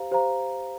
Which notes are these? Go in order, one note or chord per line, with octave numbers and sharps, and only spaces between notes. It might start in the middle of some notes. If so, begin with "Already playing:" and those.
Already playing: G4 C5 F5 A#5
G4 C5 F5 A#5